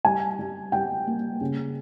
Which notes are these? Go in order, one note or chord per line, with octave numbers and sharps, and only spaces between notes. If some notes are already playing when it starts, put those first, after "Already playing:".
G3 G#5
G3
G3 G5
A#3
C#3